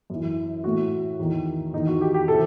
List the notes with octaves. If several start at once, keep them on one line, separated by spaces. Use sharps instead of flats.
F#2 E3
A2 E3 F#4
E2 D#3
E2 D#3 D#4
F#4
G4
G4
C3 E3 A4